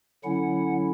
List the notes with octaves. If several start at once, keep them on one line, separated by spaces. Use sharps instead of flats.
D3 F#3 C#4 E4 F#5